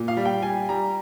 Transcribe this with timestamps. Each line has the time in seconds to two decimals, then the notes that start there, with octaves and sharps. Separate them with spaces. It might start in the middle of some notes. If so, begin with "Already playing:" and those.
Already playing: A#2
0.08 F5
0.17 G3
0.25 G5
0.42 G3 G#5
0.69 G3 A#5